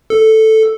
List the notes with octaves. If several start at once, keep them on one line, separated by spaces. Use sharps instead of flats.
A4